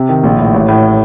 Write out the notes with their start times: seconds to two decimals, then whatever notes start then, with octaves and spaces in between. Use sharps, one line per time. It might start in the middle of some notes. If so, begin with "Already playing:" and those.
Already playing: C3
0.09 D#3
0.24 A#1
0.38 A2
0.54 A1
0.68 A2